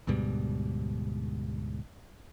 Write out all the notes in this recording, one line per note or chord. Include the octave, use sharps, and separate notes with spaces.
D2 G#2 B2 G3